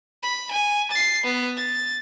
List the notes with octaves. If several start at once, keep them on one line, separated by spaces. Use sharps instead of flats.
B5
G#5
A6 C7
B3
A6